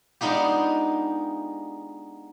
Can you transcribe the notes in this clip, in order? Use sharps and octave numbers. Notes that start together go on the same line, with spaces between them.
G#3 B3 D4 D#4 F4 G4